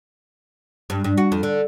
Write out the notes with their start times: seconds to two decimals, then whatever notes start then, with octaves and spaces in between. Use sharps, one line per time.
0.90 G2
1.04 G2
1.17 F#4
1.32 F2
1.43 D3